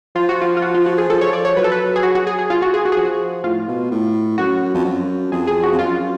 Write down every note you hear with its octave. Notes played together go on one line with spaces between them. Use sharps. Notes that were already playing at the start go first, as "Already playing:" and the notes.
F3 F4
F#4
F4
F4
F#4
F4
F#4
G#4
F3 A4
C#5
D5
C#5
F#3 B4
A4
B4
G#4
F#4
F#4
G#4
G#4
F4
F#4
G#4
F#4
G#4
F3 F#4
A2 F4
B2
A2
F#2 F#4
F2
F#2
F2 G#4
G#4
F#4
F2
F#2 F4